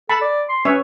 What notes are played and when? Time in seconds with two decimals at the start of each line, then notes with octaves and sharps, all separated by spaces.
0.09 A4 A5 B5
0.21 D5
0.49 C6
0.65 C#4 B4 C#5 E5